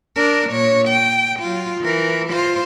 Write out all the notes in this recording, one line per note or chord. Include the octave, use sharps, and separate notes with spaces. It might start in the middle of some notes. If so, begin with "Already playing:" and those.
D4 A#4
A#2 C#5
G5
F#3 F4
E3 A#4
F4 C5